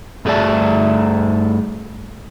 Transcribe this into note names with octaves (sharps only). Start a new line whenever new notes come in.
G2 A3 G#4 D5 E5 A5